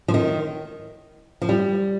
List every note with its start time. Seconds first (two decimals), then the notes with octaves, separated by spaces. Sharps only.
0.08 F3
0.14 D#3
1.42 F3
1.49 G3